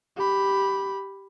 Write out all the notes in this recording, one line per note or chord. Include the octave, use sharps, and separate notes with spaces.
G4 B5